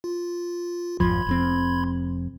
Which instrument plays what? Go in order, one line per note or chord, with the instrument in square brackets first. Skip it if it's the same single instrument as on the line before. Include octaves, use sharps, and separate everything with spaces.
[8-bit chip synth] F4
[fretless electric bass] G#1 F2 F3 [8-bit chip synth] B5 C6 G#6
[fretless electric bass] F1 F2 C4